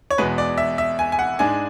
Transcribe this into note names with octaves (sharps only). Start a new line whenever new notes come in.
C#5
E2 B2 G#3 B3 B4
D5
E5
E5
G#5
G#5
F#5
G#2 G#3 D4 G#5